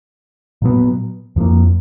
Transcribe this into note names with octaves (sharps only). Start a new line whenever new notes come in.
A#2 F#3 B3
F2 F3 A#3